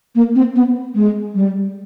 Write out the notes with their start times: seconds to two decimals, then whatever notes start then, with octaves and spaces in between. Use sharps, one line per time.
0.15 A#3
0.35 C4
0.56 B3
0.95 G#3
1.35 G3